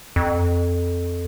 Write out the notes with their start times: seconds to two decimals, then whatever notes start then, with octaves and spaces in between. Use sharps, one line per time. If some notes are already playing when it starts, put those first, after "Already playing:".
0.16 F2